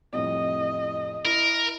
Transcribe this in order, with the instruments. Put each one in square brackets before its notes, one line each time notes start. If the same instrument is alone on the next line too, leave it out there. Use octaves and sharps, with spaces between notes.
[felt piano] C2 F2 A2 [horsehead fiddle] D#5
[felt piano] E4 [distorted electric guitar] A#4